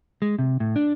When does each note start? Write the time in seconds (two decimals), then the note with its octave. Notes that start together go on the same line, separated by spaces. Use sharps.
0.22 G#3
0.39 C3
0.60 A2
0.76 D4